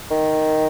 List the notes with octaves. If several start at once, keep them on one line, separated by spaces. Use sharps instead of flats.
D#3